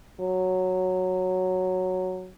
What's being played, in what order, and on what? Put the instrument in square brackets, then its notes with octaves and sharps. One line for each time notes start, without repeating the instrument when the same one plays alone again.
[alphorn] F#3